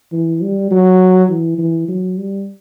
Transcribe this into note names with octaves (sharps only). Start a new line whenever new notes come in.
E3
G3
F#3
E3
E3
F#3
G3